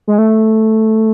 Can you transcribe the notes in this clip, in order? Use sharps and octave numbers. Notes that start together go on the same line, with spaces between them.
G#3
A3